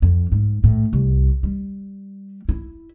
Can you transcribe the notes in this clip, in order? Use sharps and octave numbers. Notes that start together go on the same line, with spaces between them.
F2
G#2
A2
C2
G3
E4